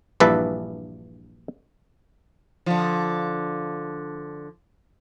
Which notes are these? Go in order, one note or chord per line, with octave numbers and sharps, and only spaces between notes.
A#1 G2 E3 B4 E5 A5
D3 F3